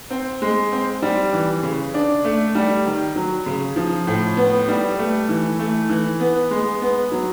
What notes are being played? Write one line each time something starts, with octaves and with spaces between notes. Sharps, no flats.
C4
G#3
C4
G3
E3
C#3
D4
A3
G3
D#3
F#3
C#3
F3
A2
B3
G3
A3
E3
A3
E3
B3
G#3
B3
F#3